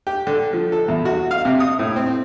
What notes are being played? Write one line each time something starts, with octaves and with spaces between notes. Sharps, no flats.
G4
D3
F3
A4
E2
F#4
F5
C3
D#6
A2
C4